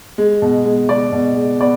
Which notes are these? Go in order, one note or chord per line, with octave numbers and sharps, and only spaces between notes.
G#3
B2
G#3
G#3 D5
B2
G#3
B3 D5